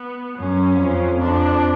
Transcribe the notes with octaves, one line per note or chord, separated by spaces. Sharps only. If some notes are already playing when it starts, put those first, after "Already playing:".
Already playing: B3
F#2 C#4
F2
F2 D4